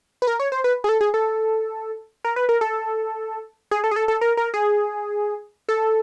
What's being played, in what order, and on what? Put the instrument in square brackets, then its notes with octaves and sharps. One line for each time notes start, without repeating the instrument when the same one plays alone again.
[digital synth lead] B4
A#4
C#5
C5
B4
G#4
A4
G#4
A4
A#4
B4
A#4
A4
G#4
A4
G#4
A4
A4
A#4
A#4
G#4
A4